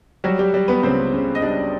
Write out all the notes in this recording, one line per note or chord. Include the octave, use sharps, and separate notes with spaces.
F#3 G3 F#4
G3 G4
G3
B3 B4
C#2 C4 C5
C#3
D#5
G3 D4 D5